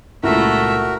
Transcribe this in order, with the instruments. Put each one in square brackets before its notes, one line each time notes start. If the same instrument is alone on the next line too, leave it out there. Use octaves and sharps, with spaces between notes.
[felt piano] C#2 A#2 [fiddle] A3 E5 [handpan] E4 [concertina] F#4 A#4